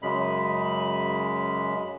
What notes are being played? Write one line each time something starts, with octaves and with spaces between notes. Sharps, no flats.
F#2 C#3 G#3 B5